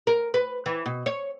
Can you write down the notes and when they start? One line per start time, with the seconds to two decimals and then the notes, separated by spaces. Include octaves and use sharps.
0.07 A#4
0.34 B4
0.66 E3
0.86 B2
1.06 C#5